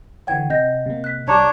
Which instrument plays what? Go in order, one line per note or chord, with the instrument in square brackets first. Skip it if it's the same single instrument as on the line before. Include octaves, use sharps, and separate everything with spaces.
[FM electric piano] D3 E3 C#5 [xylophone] F#5 G5 G#6
[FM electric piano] C3 [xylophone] D#5 G6 A#6
[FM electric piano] C3 A#3
[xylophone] F#6 B6
[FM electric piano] C2 G3 [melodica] D4 C#5 [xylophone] A5 A#5 D6